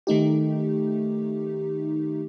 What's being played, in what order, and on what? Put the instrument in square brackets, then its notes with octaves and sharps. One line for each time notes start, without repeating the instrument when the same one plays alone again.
[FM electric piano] D#3 A3 D#4 G4